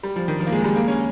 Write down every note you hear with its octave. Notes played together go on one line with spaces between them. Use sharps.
G3
F3
D#3
F3
A#3
G#3
G3
A#3
C#4